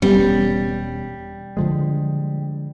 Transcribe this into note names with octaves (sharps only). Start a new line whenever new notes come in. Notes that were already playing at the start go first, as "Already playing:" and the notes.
E1 G3 B3 C#4
D3 F3 G#3